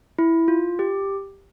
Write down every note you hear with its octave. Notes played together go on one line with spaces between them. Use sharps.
E4
F4
G4